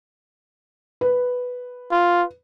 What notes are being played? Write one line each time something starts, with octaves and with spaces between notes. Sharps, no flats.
B4
F4